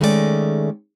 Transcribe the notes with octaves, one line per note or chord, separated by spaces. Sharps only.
D#3 G#3 A3 C#4 E4 D5